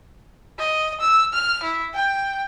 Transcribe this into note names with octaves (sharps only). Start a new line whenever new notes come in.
D#5
E6
F6
E4
G5